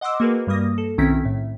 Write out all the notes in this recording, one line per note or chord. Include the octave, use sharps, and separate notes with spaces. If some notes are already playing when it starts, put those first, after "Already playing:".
D#5 F#5 C6 D6 E6
A#3 F#4 G#4 A#4 B4
G2 G3 A#3 D#6 A#6
A4
B1 D#3 C4 C#4 E4 B6
A2